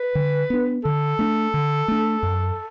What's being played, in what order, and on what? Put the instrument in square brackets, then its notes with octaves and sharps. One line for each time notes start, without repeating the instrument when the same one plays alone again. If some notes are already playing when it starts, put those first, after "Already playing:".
Already playing: [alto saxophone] B4
[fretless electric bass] D3
B3 D4
[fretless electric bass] D3 [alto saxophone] A4
[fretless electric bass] A3 D4
D3
A3 D4
F#2